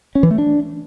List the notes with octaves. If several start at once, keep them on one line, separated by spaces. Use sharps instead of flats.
C#4
E3
A3
D4